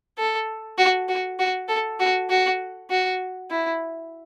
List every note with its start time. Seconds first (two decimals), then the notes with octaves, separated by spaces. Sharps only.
0.18 A4
0.78 F#4
1.08 F#4
1.39 F#4
1.68 A4
1.99 F#4
2.30 F#4
2.90 F#4
3.50 E4